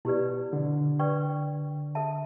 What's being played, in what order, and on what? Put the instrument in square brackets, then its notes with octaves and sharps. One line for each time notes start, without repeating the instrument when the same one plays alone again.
[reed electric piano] B2 [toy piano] E4 G4 B4 D5
[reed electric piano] D3
[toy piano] B4 D5 G5 C#6
A4 E5 A5